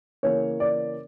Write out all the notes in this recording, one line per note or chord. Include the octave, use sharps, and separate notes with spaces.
C#3 E3 A#3 C#4 C#5
D5